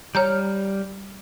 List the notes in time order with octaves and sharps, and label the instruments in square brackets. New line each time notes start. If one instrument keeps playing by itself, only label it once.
[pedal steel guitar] G3 F6 [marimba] C#5 A#5 G6